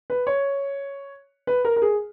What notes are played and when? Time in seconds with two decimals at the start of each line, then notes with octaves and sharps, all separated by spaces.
0.10 B4
0.27 C#5
1.47 B4
1.65 A#4
1.76 A#4
1.82 G#4